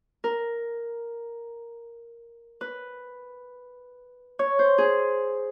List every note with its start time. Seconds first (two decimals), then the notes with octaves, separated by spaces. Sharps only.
0.24 A#4
2.61 B4
4.39 C#5
4.59 C5
4.78 G#4